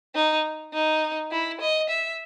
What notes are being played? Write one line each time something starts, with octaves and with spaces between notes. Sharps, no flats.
D#4
D#4
E4
D#5
E5